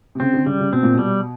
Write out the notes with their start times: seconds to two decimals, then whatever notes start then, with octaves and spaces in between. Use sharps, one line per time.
0.15 C3
0.20 C#3 C4
0.34 D3
0.46 C#3 G3
0.60 C#3
0.72 B2 C4
0.83 A#2
0.93 B2
0.99 G3